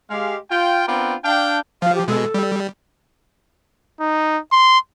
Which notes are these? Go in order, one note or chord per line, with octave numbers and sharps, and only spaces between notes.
G#3 G4 F5
F4 G5
B3 C4 D4 F4 A#4 G5
D4 F5 G5
F3 F5
G4
B2 G#3 A4
G3
D#4
C6